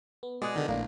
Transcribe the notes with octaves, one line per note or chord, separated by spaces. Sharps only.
B3
B2 G#3 G#4 D5 D#5 F#5
D3 D#3
A#1 A2 A#3 D4